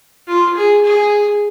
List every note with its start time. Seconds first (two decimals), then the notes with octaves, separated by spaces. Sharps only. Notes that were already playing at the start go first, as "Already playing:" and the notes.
0.28 F4
0.56 G#4
0.85 G#4